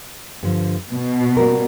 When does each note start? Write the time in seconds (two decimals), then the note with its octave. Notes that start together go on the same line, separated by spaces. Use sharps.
0.43 G2 D3 F3
0.90 B2
1.37 G3 A#3 C#4 F#4 A#4